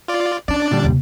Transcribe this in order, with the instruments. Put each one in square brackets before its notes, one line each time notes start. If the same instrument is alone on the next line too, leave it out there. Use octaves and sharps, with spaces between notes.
[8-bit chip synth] F4 D5
[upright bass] C#4 [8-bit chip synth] D4 D5
[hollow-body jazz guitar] A#2 D3 G3
[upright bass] D#2 C3